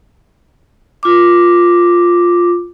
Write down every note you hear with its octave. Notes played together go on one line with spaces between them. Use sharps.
F4 D6